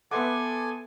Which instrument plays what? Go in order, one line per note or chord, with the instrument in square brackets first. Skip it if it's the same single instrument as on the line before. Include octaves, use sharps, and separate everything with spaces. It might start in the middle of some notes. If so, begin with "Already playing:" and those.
[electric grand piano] B3 C6 D6 [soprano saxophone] A4 [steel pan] B4 E5 F#5 [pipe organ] G#5